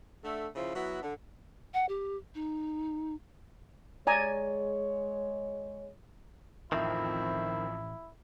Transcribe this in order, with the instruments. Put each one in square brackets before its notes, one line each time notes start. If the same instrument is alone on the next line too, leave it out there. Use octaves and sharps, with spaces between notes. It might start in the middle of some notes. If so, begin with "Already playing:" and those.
[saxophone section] D3 A3
C#3 F3 E4 F4
F#3 B3 E4 F#4
D3
[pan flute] F#5
G4
D#4
[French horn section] G#3 C#5 [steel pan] D5 G#5 A#5
[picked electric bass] A1 [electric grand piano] F2 F3 E5 [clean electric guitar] D#3 C4 [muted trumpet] E4